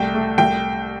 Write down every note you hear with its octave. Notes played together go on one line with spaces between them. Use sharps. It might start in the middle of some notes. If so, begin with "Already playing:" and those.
Already playing: C2 A3 G5
A3
C2 G5